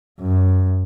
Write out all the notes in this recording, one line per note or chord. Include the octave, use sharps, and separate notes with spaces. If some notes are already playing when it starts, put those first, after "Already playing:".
F#2